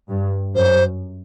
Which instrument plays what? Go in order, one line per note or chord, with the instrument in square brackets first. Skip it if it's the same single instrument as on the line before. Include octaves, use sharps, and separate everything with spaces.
[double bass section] G2
[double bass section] F#2 [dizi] C5